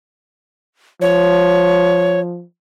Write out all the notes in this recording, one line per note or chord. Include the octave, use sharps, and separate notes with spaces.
F3 C#5